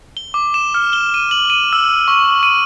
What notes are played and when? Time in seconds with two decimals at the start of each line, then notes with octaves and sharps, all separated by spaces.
0.17 G7
0.34 D6
0.54 E7
0.74 F6
0.93 G7
1.14 D#7
1.31 F#7
1.50 D#7
1.73 E6
2.08 C#6
2.43 D#7